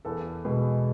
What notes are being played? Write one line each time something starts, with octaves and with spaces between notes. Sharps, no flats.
E2 A4
B2 G#3